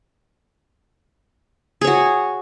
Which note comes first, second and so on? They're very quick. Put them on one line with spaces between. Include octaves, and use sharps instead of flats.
G#4 C#5 F#4